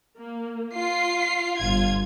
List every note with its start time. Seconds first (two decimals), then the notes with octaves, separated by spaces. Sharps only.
0.18 A#3
0.74 F4 C7
1.60 G1 F4 G#6